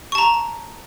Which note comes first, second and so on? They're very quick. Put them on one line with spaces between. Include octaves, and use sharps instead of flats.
C#6 A5 A#5